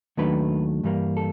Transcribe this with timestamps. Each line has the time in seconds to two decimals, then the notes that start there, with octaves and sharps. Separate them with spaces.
0.17 D#2 D#3 F#3 A3 D4 B4
0.84 G2 E3 G3 A#3
1.17 A4